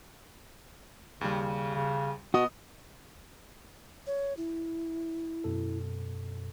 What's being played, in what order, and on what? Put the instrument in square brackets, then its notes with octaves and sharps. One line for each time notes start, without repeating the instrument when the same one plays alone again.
[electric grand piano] D#2 G3 [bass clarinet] C#3
[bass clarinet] C#3
[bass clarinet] B2 [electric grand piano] B3 D#5 D#6 [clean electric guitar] F#4
[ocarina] C#5
E4
[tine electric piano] F#2 B2 A4